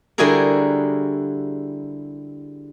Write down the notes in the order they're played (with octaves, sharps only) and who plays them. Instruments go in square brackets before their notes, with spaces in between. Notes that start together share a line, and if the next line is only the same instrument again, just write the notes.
[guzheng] D3 G3 E4 F#4 G#4 A#4